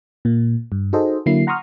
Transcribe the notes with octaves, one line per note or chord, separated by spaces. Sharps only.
A#2 A#3
G2
D#4 F#4 G#4 A4 C5 D#5
D3 F#3 A#3 E4 C7
F#5 A#5 C6 C#6 D#6 F6